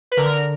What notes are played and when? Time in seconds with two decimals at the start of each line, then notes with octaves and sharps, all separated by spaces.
0.12 B4
0.17 D3 A#4